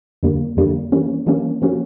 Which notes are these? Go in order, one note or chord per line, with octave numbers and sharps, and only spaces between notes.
F2 D3 G3 A#3
F2 D3 G3 A#3
E3 G3 A#3 C#4
E3 G3 A#3 C#4
F3 A#3 C#4 F#4